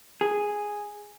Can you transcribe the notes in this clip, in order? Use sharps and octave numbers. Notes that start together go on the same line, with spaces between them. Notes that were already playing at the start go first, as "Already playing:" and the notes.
G#4